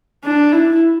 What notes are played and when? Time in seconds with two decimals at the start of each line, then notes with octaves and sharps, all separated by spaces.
0.24 D4
0.52 E4